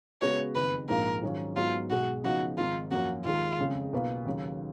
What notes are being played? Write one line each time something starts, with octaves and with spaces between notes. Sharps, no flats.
C#3 G#3 B3 F#4 B4 C#5
F#1 F2 D#3 B4
A#1 G#2 F3 A#3 F4 A#4
G#2 D#3 F#3 C#4 F4
G#2 F#3 B3 F4 F#4
B1 B2 G#3 F#4
C#3 F3 B3 D#4 F#4
G#1 G#2 D#3 F4
F#2 F3 A#3 C#4 F#4
D#2 D#3 G#3 F4
F#1 F2 C#3 G#3
B1 B2 A#3 F4 B4
D#2 C#3 F#3